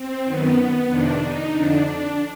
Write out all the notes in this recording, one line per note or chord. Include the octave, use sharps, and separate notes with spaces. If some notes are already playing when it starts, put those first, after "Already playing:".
Already playing: C4
F#2 D#3 B3
F2 C3 D#3 D4
D#4
F2 D3 D4